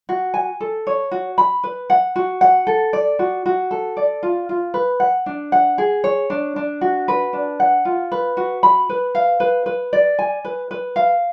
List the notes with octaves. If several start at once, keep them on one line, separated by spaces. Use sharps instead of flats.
F#4
G#5
A4
C#5
F#4
B5
B4
F#5
F#4
F#5
A4
D5
F#4
F#4
A4
D5
F4
F4
B4
F#5
D4
F#5
G#4
C#5
D4
D4
F#4
B4
D4
F#5
F4
B4
F#4
B5
B4
F5
B4
B4
D5
G#5
B4
B4
F5